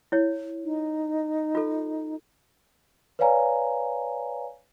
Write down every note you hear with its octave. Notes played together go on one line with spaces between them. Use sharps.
E4 C#5
D#4
F4 A4
B4 C#5 D5 F5 G#5 A#5